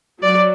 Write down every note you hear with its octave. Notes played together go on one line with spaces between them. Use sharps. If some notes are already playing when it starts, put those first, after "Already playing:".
F#3 D5